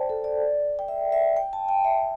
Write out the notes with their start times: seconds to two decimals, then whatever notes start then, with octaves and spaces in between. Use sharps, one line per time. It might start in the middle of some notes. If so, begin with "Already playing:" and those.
Already playing: C5 D5 G5 A5
0.10 A4
0.24 D5
0.79 G5
0.88 E5
1.12 E5
1.37 G5
1.53 A5
1.69 G5
1.85 E5